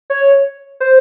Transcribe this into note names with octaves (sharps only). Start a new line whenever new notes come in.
C#5
C5